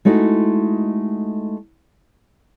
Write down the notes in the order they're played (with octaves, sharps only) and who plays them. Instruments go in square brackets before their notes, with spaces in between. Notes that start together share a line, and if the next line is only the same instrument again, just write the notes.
[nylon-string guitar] G#3 A3 D#4 E4 F#4